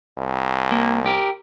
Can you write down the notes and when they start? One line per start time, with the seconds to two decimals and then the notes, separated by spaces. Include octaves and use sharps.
0.18 C2
0.71 A#3
1.06 G4 A#4